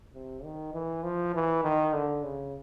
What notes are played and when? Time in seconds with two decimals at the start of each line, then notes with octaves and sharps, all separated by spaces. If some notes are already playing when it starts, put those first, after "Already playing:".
0.15 C3
0.44 D#3
0.74 E3
1.04 F3
1.34 E3
1.64 D#3
1.93 D3
2.23 C#3